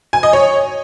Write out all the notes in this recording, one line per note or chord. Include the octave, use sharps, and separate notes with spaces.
G#5
D#5
C#5